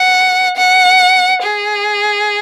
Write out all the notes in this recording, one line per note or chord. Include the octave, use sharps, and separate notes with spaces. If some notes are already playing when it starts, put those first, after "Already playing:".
Already playing: F#5
F#5
G#4